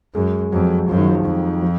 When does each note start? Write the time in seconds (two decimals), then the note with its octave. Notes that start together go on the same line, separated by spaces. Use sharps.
0.15 F#2 G#3
0.52 F2 F#3
0.89 F#2 F3
0.98 D#3
1.08 F3
1.25 F2 D#3
1.62 F3